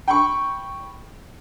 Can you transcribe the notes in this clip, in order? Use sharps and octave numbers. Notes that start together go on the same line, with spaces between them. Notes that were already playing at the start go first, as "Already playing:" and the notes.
G5 B5 C#6